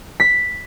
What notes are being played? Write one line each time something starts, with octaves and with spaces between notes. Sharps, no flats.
B6